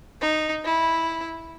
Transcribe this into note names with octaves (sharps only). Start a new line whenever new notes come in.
D#4
E4